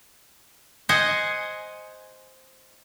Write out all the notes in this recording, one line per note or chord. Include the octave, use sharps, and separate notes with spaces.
C5 D#5 F#5 G#5